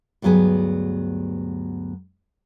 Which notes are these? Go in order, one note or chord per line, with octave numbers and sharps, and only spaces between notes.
D2 G2 F#3 B3 G#4 B4